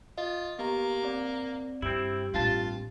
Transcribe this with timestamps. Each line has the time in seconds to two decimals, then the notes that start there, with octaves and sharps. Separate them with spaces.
0.18 F4 D#5
0.59 A#3 B3 G4 A#5
1.03 C4 D5
1.82 G2 C4 E4 G4 D7
2.34 A1 G2 C4 F4 A5